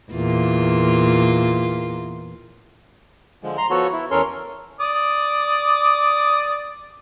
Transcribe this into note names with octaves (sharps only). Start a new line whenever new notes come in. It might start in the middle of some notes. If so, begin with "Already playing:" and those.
E2 A#2 F4
D3 F3 G#3
A#5 C6
F3 B3 F#4 A4 C#5
E4
E2 C#4 A4 A#4 C#5 C6
D5 D6 D#6